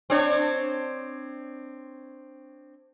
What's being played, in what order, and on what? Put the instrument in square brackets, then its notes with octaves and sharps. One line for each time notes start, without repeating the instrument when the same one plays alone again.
[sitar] C4 D4 C#5